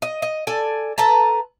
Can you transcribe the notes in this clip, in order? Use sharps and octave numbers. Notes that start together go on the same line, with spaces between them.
D#5
D#5
A4 D5 G#5
A4 B4 A5 A#5